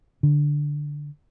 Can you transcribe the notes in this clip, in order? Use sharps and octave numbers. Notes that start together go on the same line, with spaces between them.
D3